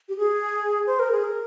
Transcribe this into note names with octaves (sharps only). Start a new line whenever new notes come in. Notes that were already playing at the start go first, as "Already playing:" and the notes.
G4
G#4
C5
A#4
G#4
A#4